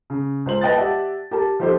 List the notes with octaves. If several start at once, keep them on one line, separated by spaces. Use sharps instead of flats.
C#3
C#2 C5 F#7
B4 D#5 G5 A5 D#6 A6
G4 D5 E5 F#5 A5
G4 A#4 A5
F3 D#4 G4 A4 C5